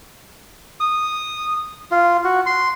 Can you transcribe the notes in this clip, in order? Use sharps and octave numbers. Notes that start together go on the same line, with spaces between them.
D#6
F4
F#4
C6